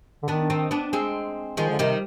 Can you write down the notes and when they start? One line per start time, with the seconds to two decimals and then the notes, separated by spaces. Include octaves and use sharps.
0.23 D3
0.28 D#3 B3 D4
0.50 C4 D#4
0.71 B3 D4
0.93 G#3 C4
1.57 D#3 F3 G#3
1.70 D3
1.79 C3 D#3 G3